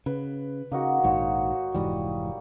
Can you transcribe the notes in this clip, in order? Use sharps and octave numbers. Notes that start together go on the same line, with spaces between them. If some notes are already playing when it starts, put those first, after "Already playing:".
C#3 B4
C#3 A#3 D#4 F#4
A#1 G#2 D#3 F#4 C5 C#5
F1 G#2 E3 G3 D#6